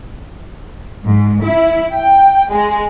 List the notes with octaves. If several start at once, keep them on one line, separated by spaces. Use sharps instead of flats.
G#2
E4
G5
G#3